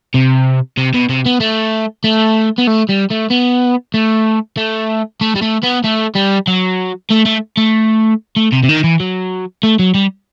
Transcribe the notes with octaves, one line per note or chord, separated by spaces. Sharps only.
C3
C3
B2
C3
B3
A3
A3
B3
A3
G3
A3
B3
A3
A3
A3
G3
A3
B3
A3
G3
F#3
A3
A3
A3
A3
C3
C3
D#3
E3
F#3
A3
F#3
G3